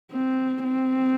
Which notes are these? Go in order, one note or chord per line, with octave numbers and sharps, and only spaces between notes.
C4
C4